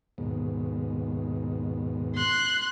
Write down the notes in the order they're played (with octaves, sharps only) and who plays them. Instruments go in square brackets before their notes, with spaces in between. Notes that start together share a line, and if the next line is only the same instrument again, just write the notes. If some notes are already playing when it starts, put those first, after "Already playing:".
[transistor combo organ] D#2 G#2 B2
[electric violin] C6 F#6